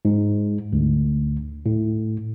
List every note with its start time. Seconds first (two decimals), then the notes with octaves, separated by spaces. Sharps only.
0.05 G#2
0.73 D2
1.66 A2